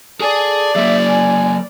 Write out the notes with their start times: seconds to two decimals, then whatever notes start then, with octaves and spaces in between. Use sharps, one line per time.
0.20 G#4 A4 D5 G#5
0.76 F#3 A#3 E5
1.08 G#5